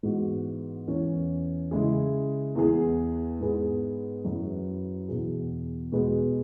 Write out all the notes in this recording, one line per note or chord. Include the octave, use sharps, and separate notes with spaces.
G#2 E3 G#3 B3 F#4
E2 E3 C#4
C#3 G#3 E4 G#4
E2 E3 B3 G#4
G#2 G#3 B3 G#4 B4
F#2 F#3 E4 G#4 B4
E2 B2 B3 G#4
B2 G#3 B3 G#4 B4